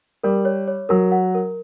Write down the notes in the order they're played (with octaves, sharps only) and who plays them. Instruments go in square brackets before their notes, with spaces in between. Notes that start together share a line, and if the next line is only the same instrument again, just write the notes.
[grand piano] G3 [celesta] A#4
[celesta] C#5
C#5
[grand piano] F#3 [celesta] A#4
[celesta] F#5
A#4